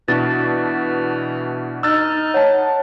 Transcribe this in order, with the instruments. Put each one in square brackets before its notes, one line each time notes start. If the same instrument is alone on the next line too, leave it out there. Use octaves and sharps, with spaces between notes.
[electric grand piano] B2 D4 F#4 [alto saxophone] E3 [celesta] A6
[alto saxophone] D#4 [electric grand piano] E6 F6 A6
[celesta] C#5 [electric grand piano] F#5 A5